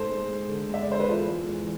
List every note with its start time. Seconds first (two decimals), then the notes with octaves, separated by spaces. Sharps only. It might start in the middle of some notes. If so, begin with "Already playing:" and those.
Already playing: G#2 A4 C5
0.09 G#3
0.29 G#3
0.49 D3
0.69 G#3 E5
0.83 D5
0.89 D3 C5
1.00 B4
1.09 E2 F4 A4
1.29 G#3
1.49 E2